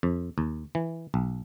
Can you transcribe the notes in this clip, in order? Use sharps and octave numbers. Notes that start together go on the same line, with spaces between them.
F2
D#2
E3
B1